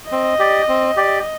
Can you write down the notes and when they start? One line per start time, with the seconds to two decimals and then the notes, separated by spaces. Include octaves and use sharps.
0.11 C4 D#5
0.39 G4 D5
0.68 C4
0.97 G4 D5